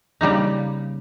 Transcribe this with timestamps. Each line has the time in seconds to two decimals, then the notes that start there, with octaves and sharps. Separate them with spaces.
0.21 C#3 G3 A#3 D#4